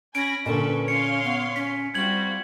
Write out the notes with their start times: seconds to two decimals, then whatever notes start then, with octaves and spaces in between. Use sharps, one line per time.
0.15 C#4 G#5 B5 A#6 D7
0.46 A#2 D3 C#4 A4 B4 C#6
0.88 C#4 C#5 F5 C6 C#7
1.24 B3
1.56 C#4 B6
1.94 G3 C4 F4 F#4 G#6 F#7